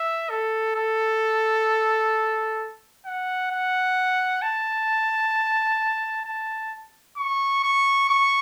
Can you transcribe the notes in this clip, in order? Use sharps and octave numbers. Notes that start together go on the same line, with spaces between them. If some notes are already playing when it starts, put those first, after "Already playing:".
Already playing: E5
A4
A4
F#5
F#5
A5
A5
C#6
C#6
C#6